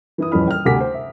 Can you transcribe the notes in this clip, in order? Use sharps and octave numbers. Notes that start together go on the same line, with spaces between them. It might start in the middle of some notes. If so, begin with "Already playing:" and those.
E3 E4 D#6
D#1 F2 E3 C#4 B5 F6
G5 F6
D2 C3 F#5 G#5 D6 B6
C5
E5